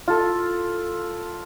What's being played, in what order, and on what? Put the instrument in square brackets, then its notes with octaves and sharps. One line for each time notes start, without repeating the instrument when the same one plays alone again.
[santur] F4 A4